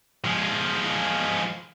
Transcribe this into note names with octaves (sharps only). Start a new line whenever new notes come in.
F3 G#3